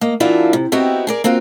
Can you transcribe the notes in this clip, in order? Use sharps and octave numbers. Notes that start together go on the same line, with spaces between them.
A#3 D#5
E3 F#3 A#3 D4 E4 F4
C3
B3 C4 D#4 E4 F#4 G4
G#4 A#4 D5
A#3 C4 F4 F#4